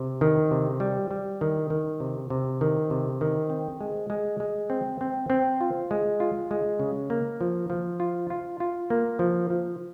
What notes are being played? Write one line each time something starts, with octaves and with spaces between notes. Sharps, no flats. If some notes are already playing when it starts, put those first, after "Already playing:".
Already playing: C3
D#3
C3
G3
G3
D#3
D#3
C3
C3
D#3
C3
D#3
C4
G#3
G#3
G#3
C4
C4
C4
F4
G#3
F4
G#3
C#3
A#3
F3
F3
F4
F4
F4
A#3
F3
F3